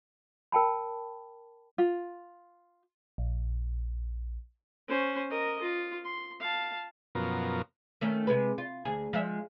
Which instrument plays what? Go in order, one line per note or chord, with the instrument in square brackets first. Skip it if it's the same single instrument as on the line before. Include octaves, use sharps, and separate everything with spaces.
[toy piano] A#4 G5 A5 B5
[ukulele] F4
[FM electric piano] A#1
[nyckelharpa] C#4 C5
A#4 D#5
F4
C6
F5 A5
[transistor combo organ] F#2 B2 F3 A#4
[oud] D#3 A3 C#4
C3 G#3 B4
F4
D2 G#4
F3 G#3 E5